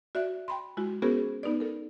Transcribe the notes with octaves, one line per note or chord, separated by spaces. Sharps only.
F#4 D5 E5 F#6
G5 B5 C6
G#3 E4 F#4
B3 C#4 F#4 G#4 A#4 C5
B3 D#4 B4 D5
A4 A#4